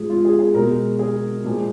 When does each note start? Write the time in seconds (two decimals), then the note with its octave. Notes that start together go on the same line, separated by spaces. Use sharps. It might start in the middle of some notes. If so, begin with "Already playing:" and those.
Already playing: G#2 F3 G#3 G#4
0.09 F4
0.25 G#4
0.39 G#4
0.54 B2 G#3 A#4
0.99 G#4
1.45 A#2 F3 G#3